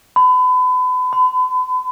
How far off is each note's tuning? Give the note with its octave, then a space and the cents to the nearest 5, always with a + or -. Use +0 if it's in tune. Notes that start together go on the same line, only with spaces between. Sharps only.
B5 +35
B5 +45